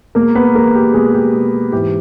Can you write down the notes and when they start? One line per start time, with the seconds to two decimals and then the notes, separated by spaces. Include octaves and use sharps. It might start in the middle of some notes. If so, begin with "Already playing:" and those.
0.15 B2 G#3 A#3 A#4
0.35 B3 B4
0.54 B2 G#3 A#3 A#4
0.75 G4
0.93 B2 G#3 G#4
1.14 G4
1.34 B2 G#3
1.72 G#2 E3 G#3 G4